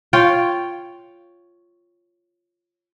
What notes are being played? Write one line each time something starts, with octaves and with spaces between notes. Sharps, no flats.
F4 C#5 G5